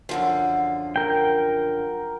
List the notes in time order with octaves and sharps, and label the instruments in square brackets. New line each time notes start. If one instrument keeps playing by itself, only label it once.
[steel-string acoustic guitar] F#2 D3 F3
[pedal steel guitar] A#4 G5